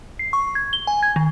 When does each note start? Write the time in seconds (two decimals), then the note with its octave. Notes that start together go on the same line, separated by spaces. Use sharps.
0.19 C7
0.33 C#6
0.55 G#6
0.73 G7
0.87 G#5
1.03 G#6
1.16 D#3